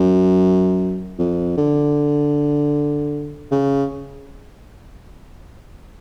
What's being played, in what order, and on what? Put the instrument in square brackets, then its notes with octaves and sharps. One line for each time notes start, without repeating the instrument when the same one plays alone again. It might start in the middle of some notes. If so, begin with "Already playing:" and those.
Already playing: [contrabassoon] F#2
F2
D3
C#3